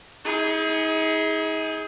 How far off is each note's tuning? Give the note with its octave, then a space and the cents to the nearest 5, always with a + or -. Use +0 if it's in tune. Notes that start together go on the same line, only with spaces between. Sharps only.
D#4 +40 G#4 +0